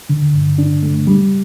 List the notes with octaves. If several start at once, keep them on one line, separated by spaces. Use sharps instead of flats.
D3
G2
D4
A3
G3